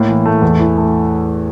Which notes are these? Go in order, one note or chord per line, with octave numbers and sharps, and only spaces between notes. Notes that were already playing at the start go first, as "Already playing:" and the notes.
Already playing: A2 A#3
E3
A3
E2
E3
A3